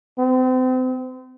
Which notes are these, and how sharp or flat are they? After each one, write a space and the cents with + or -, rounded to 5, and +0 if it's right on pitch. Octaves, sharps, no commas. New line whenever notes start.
C4 -35